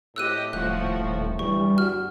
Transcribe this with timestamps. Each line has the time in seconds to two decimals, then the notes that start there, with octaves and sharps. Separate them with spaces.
0.16 A2 C4 G4 D#5 E6 F#6 D#7
0.53 D#1 F3 A3 F#4 F#6
1.00 D#1
1.39 G1 E3 G3 C#6
1.78 F#4 F6